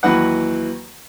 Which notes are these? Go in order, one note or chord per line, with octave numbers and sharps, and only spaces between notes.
D#2 E3 F#3 B4 F#5